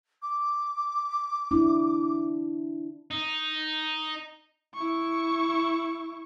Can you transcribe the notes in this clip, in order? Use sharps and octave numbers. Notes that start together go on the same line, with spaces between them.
D6
D4 E4
D#4
E4 C#6